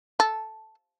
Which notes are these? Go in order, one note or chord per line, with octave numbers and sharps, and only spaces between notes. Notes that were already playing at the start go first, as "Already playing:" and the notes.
A4